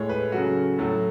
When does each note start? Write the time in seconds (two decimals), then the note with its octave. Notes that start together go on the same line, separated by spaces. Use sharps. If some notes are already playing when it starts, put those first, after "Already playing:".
Already playing: A2 G#3 C#5
0.09 B4
0.32 C#3 F#3 A3 F#4
0.79 A2 F#3 A3